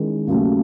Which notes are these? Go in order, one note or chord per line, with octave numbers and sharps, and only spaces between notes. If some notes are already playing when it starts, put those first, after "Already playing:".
Already playing: D#3 G#3 C#4 E4
D#2 C#3 F#3 A3